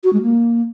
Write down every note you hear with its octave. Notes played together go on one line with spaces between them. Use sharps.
F#4
G#3
A#3